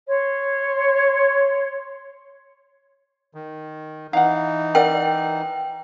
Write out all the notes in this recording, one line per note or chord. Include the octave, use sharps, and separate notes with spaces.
C#5 C6
D#3
E3 D#4 F5 F#5
A#4 D5 F#5 G5